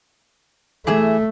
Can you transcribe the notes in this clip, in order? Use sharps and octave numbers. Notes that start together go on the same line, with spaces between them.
E3 A3 G#4 E5